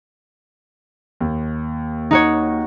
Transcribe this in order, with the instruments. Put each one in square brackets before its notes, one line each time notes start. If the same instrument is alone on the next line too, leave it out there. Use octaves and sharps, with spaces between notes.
[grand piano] D#2
[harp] D#4 F#4 C#5